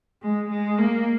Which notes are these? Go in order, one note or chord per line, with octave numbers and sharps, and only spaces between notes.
G#3
G#3
A#3